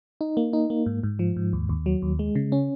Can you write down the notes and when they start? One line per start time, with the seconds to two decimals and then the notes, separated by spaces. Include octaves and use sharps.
0.21 D#4
0.37 A#3
0.53 D#4
0.70 A#3
0.86 G#2
1.03 G#2
1.19 F3
1.36 G#2
1.53 D#2
1.69 D#2
1.86 F#3
2.02 D#2
2.19 G#3
2.35 C#3
2.52 C#4